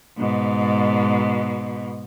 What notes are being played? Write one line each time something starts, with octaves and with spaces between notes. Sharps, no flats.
G#2 B2